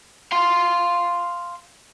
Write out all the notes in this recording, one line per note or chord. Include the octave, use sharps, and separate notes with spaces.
F5 C6